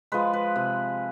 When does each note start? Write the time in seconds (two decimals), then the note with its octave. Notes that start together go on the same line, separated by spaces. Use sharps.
0.12 F3 G#3 B4
0.33 B4
0.56 C3